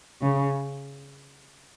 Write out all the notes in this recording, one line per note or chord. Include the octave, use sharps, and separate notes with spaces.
C#3